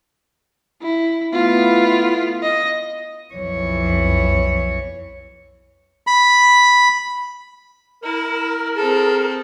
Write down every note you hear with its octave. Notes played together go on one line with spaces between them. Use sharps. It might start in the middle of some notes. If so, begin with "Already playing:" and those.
E4
A3 B3 E4 F4
D#5
B1 F2 E3 C#5
B5
E4 A#4
C4 G#4 A4